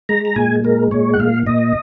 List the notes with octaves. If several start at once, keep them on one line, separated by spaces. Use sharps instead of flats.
G#3 A#5
A#5
A#2 G#5
G#3 A#4
A#2 C#5
F#5
A#2 F5
A#2 D#5